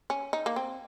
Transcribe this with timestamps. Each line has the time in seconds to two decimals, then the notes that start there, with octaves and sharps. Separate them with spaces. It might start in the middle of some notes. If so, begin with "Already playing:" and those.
0.10 C#4
0.33 D#4
0.46 A#3
0.56 C4